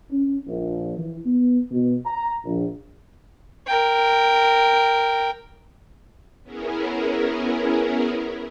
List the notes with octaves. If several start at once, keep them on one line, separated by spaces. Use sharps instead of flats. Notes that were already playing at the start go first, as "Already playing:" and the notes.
C#4
A#1
E3
B3
B2
A#5
A#1
A#4 G5
B3 C#4 E4 G#4 A#4